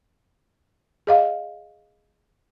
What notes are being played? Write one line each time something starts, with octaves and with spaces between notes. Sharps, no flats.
G#4 D#5 F5